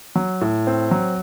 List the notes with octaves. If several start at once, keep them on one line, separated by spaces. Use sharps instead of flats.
F#3
A2
C4
F#3